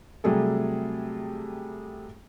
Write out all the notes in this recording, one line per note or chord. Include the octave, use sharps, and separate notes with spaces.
C3 F#3 G3 A3 G#4 A4